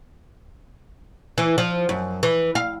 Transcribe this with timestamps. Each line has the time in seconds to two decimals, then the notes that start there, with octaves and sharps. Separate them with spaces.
1.38 E3
1.58 F3
1.89 F#2
2.23 E3
2.55 F5